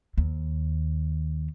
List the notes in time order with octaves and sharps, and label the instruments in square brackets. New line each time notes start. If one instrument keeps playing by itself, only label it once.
[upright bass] D#2